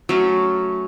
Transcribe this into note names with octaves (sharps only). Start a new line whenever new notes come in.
F#3 A3 C#4